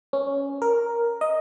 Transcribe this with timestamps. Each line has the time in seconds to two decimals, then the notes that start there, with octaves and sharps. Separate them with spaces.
0.13 C#4
0.62 A#4
1.21 D#5